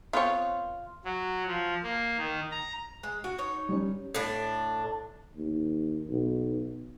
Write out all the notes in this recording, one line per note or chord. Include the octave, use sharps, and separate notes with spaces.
B3 C4 F4 C#5
F#3
F3
A#3
D#3
A#5
G#3
F#4
D#4 C#5
G3 C#4
A2 D4
D#2
B1